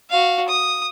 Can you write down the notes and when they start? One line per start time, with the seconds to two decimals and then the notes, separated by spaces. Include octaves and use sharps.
0.10 F#4 F5
0.48 D#6